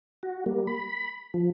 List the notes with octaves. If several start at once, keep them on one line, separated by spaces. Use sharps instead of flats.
F#4
G3 A#3
B5
F3